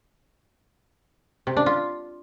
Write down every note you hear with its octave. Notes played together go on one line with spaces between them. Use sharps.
C3
D4
F4